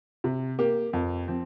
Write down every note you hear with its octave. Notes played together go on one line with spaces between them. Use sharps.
C3
A#3 G4
F2
F3 C4